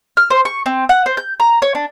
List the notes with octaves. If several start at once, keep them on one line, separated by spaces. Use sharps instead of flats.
F6
C5
C#6
C4
F#5
C5
G6
A#5
C#5
D4